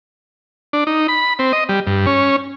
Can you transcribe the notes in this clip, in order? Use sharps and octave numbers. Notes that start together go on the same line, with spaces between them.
D4
D#4
B5
C4
D#5
G3
G2
C#4